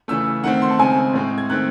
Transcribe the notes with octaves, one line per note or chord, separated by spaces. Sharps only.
C#3 E3 A3 E6
D#3 A3 C4 F#5
C6
A5
C#3 G#3 C4 G#5
A2 G#3 C4
G#6
D#3 A3 C4 F#6